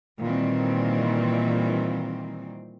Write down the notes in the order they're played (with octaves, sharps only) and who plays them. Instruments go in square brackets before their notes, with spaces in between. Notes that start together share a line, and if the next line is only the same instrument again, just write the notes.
[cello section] A#2 D#3 E3 G3 C4